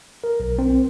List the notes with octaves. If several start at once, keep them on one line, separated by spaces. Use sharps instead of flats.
A#4
B1
C4